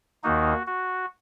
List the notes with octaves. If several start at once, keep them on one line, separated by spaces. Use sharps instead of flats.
D#2 D#3 A#3 D#4 F#4
F#4